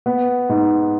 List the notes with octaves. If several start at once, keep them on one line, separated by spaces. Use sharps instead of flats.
B3
G#2